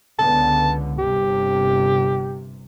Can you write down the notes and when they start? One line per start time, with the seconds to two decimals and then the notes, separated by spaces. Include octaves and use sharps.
0.19 C#2 D3 B3 A5
0.98 G1 C3 G4